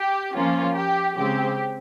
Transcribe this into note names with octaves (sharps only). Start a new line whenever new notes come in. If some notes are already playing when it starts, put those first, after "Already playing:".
Already playing: G4
F3 A#3 C#4 F4
G4
C#3 G#3 C4 G4